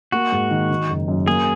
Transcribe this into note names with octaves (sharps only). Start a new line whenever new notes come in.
A#3 F#4
G#2
D#3
D#3
F#1
F#2
A#3 G#4